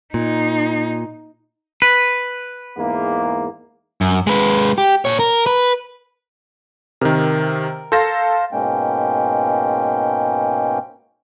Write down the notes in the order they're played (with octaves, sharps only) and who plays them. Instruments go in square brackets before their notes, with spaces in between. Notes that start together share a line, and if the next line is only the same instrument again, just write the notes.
[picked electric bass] A#2 [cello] D#4
[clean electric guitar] B4
[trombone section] E2 G#2 A#3
[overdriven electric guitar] F#2
G#3 B4
G4
A#2 C#5
A#4
B4
[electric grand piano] C3 D#3 [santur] A#4
[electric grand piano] A4 A#6 [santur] C5 F5 A5
[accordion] G#2 B2 G#3 A#3 C#4 G5